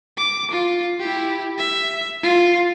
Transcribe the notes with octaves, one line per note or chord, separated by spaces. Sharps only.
D6
F4
E4 G4
E5
F4